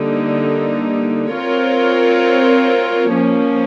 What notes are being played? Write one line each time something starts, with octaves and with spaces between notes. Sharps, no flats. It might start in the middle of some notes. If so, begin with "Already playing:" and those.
Already playing: D3 G3 A#3 D#4
C4 F4 A#4 C#5
F3 A#3 C#4